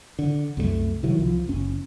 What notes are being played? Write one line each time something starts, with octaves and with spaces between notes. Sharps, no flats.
D3
C2 F#2 F#3 A3
C3 D#3 E3 F#3
C2 F3
F#1 C#4